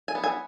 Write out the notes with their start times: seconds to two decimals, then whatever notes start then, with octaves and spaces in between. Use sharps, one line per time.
0.08 G#5
0.15 B3
0.24 G#5